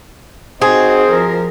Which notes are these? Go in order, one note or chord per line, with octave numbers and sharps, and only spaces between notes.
C4 D#4 F#4 G#4
F3 A#4